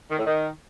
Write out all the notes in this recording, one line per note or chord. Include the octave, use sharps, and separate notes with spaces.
D#3
A2
D#3